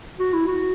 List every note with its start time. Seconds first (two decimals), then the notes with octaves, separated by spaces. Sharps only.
0.19 F#4
0.34 E4
0.47 F#4